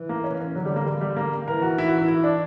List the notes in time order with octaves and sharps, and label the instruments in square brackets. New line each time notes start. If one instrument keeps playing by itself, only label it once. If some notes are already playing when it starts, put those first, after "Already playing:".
Already playing: [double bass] E3
[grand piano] A#3
C#4
C#4
[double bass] D3 [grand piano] F#3
[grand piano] G3
A#3
G3
G3
A#3
[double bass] E3 [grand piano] A#4
[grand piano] F#4
E4
F#4
E4
E4
D4